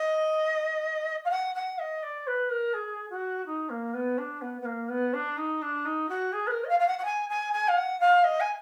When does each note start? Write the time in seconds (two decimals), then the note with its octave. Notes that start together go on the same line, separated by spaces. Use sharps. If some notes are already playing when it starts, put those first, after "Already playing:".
Already playing: D#5
1.25 F5
1.30 F#5
1.54 F#5
1.78 D#5
2.02 D5
2.27 B4
2.49 A#4
2.73 G#4
3.10 F#4
3.46 D#4
3.69 A#3
3.93 B3
4.18 D4
4.41 B3
4.61 B3
4.65 A#3
4.89 B3
5.13 D4
5.37 D#4
5.61 D4
5.85 D#4
6.09 F#4
6.32 G#4
6.46 B4
6.50 A#4
6.64 D#5
6.68 F5
6.79 F5
6.87 F#5
6.98 F#5
7.04 G#5
7.29 G#5
7.53 G#5
7.68 F5
7.76 F#5
8.00 F5
8.23 D#5
8.40 G#5